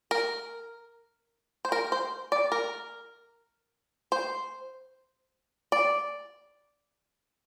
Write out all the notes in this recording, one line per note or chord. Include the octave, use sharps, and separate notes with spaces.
A#4
C5
A#4
C5
D5
A#4
C5
D5